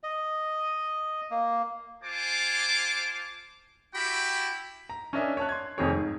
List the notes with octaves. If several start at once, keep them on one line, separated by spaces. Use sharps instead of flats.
D#5
A#3
F4 C5 G#5 A5 D6
E4 F#4 G4 G5 B5
A#5
C#4 D4 A#4 D#5 E5 G#5
C#5 A5 F#6
C6 G#6
F1 F2 D#3 C4 G#4 C#5
G#2